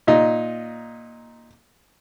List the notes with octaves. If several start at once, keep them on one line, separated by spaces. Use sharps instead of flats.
A#2 D#4